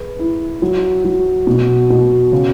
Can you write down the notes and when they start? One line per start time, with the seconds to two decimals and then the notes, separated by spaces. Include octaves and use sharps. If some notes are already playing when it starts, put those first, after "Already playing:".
Already playing: G#4 B4
0.19 E4
0.62 F#3
1.05 F#3
1.47 B2
1.90 B2
2.32 C#3